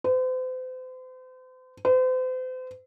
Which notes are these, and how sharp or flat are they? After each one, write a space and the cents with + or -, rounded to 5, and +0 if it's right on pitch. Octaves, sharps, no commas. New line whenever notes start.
C5 -40
C5 -40